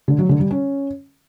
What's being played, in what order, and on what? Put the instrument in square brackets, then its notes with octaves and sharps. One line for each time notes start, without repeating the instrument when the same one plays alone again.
[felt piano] D3
F#3
D3
G3
C#4